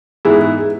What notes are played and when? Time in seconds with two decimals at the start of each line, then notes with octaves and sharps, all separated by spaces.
0.25 G#2 E3 B3 E4 G#4
0.58 G#4